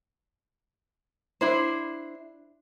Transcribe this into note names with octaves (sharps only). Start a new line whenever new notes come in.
D4 E4 C5